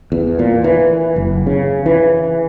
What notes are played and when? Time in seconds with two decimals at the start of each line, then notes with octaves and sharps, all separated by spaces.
0.12 E2
0.39 A#2
0.64 E3
1.16 F#1
1.46 C#3
1.86 E3